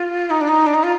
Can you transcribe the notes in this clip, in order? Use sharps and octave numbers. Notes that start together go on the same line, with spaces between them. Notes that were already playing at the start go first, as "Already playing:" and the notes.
Already playing: F4
D#4
D4
D#4
D4
D#4
F4